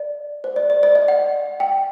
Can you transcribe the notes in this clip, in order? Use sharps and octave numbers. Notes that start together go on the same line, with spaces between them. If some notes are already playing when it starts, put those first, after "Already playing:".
Already playing: D5
C5
D5
D5
D5
D#5
F#5
G5